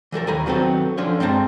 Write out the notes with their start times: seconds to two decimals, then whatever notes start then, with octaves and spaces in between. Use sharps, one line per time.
0.12 E3 G3 A4 A#4
0.27 D#2 G#5 A#5 B5
0.46 D#3 F#3 B3 C4 A4
0.97 D3 F3 C#4 F4 C#5
1.20 G2 G#3 C4 A5 A#5